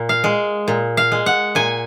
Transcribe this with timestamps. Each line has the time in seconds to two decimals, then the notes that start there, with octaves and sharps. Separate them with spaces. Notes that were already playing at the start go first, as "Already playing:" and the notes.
Already playing: A#2
0.09 F5
0.24 G#3
0.68 A#2
0.97 F5
1.12 G#3
1.26 F#5
1.55 A#2 G#5